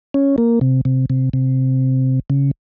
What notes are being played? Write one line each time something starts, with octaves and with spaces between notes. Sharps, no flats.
C#4
A#3
C3
C3
C3
C3
C#3